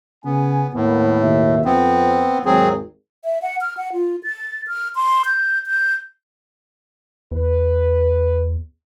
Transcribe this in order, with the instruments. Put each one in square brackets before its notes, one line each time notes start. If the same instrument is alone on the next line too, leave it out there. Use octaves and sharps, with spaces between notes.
[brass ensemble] C#3 G#5 [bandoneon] B3
[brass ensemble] D#2 A#3 B3 [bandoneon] A2
[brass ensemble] D#2 B2 E5
[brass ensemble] F2 [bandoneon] B3 C4
[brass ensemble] G#1 D#2 [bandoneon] F#3 C4 G#4
[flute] E5
F#5
F6
F#5
F4
A6
F6
C6
G6
G6
[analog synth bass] E2 [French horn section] B4